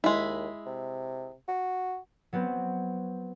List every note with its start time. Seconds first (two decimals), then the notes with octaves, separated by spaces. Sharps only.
0.04 D#2 G#3 E4
0.66 C3
1.49 F#4
2.33 F#3 B3 C4